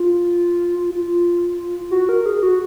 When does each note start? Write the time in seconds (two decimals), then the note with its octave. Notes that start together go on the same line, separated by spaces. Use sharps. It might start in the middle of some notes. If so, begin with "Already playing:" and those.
Already playing: F4
0.91 F4
1.91 F#4
2.09 A#4
2.26 G#4
2.43 F#4